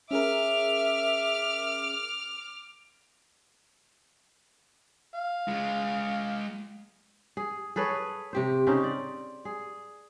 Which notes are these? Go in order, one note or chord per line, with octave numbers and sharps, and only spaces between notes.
C#4 G#4 A#4 E5 D6 F6
F5
G#3 F4
G#4
G#4 A4 B4 C#5
C3 G4 C5
C#3 C#4 D#4 C5
D5
G#4